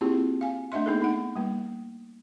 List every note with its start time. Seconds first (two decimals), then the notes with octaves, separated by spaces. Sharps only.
0.01 A#3 C4 E4 F4 G4 G#4
0.41 F5 G#5
0.72 A3 D4 D#5 E5 C6
0.86 A#3 B3 D#4 G#4 A4
1.02 D#4 F#5
1.36 G3 A#3